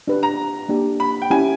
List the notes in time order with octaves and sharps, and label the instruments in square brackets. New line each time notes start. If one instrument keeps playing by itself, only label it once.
[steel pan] D4 G4 B4
[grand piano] A#5
[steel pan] A#3 D4 G4
[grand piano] B5
G5
[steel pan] C#4 E4 G4 [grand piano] G#5